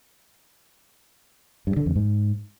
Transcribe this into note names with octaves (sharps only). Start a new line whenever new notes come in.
G2
D3
F2
G#2